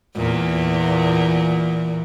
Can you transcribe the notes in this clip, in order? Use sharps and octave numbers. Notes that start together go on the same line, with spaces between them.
E2 A#2